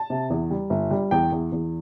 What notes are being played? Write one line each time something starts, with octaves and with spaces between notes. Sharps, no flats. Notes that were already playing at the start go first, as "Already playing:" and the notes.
Already playing: A5
C3
E2
G3
G1
G3
E2 G5
E2
E2